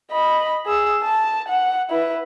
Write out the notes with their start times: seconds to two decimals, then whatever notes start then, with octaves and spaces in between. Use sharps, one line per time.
0.11 D#5 B5
0.66 G#4 E6
1.03 A5
1.48 F#5
1.90 E4 B4